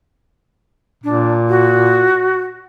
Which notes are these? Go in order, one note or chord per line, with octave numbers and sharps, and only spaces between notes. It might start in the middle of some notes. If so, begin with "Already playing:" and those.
A#2 D4
F#4